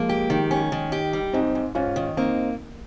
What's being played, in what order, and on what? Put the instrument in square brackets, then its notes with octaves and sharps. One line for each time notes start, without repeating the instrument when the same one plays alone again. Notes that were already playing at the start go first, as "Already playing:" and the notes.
Already playing: [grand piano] F3 G#3 [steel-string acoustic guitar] A#3
[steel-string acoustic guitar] G4
D#3
C#4
D#3
G4
G3
[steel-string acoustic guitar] G#2 [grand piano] C4 D#4
[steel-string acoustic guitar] G#2
[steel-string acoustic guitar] G#2 [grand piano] C#4 F4
[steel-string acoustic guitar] D#3
[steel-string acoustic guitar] A#3 [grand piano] C4 D#4